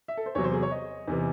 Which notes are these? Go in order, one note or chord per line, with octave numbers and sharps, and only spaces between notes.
E5
A4
C5
E2 C3 F#3 C#5
C5
G#4
C#5
D#5
E2 C3 E3